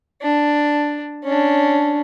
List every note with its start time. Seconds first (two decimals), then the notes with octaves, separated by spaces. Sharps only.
0.22 D4
1.24 C#4 D4